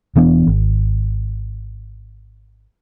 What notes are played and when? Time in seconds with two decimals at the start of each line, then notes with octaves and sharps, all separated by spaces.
0.16 E1 E3 B3 D4
0.47 G#1